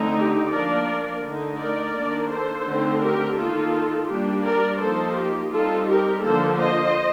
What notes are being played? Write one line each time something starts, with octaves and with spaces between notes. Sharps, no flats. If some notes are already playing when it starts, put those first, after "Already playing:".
Already playing: D3 A3 C4 D#4
G4
F3 A#3 D4 A#4 D5
D3 A3 D#4
A#4 D5
D#3 A#3 D4
A4 C5
D3 A3 C4 D#4
G4 A#4
D#3 A#3 D#4 F4 A4
G3 A#3 D4 G4
A#4 D5
F3 A#3 D#4 A4 C5
G4
G3 C4 D#4 F4 A4
G4 A#4
D3 F3 A#3 A4 C5
C5 D#5